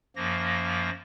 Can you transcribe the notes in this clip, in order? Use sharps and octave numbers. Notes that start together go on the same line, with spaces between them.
F#2 F3 A#3 A#6